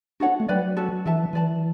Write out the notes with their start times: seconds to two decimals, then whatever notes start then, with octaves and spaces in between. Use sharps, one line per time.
0.20 D4 F#4 A4 C#5 F#5
0.40 A3
0.48 F#3 B4 D5 G5 B5
0.77 C#4 F#4 A4 D5
1.05 E3 D4 A4 E5 A5
1.33 E3 B4 D5 A5